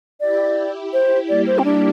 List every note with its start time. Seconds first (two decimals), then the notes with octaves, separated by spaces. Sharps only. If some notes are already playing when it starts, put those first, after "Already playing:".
0.20 E4 G4 D5
0.93 E4 G4 C5
1.28 G3 A#3 D5
1.47 C5
1.59 C4
1.64 D4